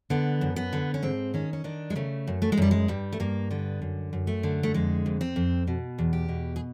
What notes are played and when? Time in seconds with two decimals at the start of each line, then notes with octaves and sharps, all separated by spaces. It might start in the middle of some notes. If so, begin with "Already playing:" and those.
0.10 D3 B3
0.41 F#2
0.56 B3
0.73 D3
0.94 C#4
1.02 G#2 C4
1.34 D#3 C#4
1.53 C#4
1.64 D#3 D4
1.90 G#3
1.96 C#3 A3
2.27 F#2
2.42 A3
2.52 G#3
2.57 F#2 G3
2.71 G#3
2.88 G2 G3
3.12 A3
3.20 G2 A#3
3.51 D3 B3
3.82 F#2
4.13 F#2
4.27 A3
4.43 D3
4.63 A3
4.74 F2 G#3
5.06 F2
5.21 C4
5.36 F2
5.67 B2
5.98 E2
6.13 G4
6.28 B2
6.56 G#4